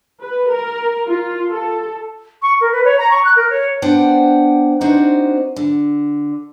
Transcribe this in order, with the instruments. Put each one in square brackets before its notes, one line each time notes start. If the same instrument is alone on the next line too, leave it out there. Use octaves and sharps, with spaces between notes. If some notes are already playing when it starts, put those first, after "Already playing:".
[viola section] B4
A#4
F4
A4
[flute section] C#6
A#4
B4
C#5
A#5
C#6
F#6
A#4
C#5
[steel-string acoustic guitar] B3 D4 C5 D5 F#5 G5
C4 D4 D#4 F#4 C5
D3